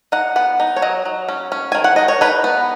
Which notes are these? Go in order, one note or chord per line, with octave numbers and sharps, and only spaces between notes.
D#4 F#5
B3 F#5
D#4
C#5
F#3 D#5
F#3
C#4
C#4
D#3 G#5
F#5
D#4 D#5
C#5
D#4 B4
B3